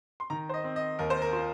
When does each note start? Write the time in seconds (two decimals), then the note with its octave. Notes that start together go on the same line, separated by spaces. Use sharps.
0.20 C6
0.30 D#3 A#5
0.49 C5
0.54 D#5
0.64 C4
0.76 D#5
0.99 D#2 A#4
1.10 C5
1.22 A#4
1.33 F4